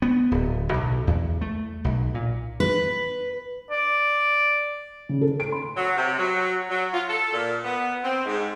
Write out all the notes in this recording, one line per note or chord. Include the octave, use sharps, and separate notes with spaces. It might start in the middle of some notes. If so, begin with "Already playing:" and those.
B3
D1
B1
E2
A3
B1
A#2
B4
D5
C#3
A4
D7
C6
F#3
C3
F#3
F#3
F4
A4
A#2
B3
C4
G#2